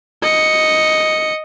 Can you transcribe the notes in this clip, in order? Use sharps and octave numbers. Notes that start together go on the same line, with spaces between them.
D#5 C#7